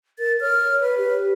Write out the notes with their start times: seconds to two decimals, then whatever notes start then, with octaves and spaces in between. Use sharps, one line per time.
0.19 A#4 A6
0.41 C#5 F6
0.81 B4
0.98 G4